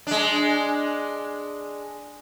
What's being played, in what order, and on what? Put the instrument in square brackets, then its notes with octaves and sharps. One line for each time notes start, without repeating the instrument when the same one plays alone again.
[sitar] G#3 D4